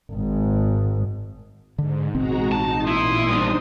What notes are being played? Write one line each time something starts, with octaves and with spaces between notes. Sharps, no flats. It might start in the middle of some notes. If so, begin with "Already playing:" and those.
G#1 G#2
G#2 D3
A1 B2 G#3 C4 F#4 A#5
D#4 A5
A#2 E4 C6 D#6
G3 B3 D4 D#4 C5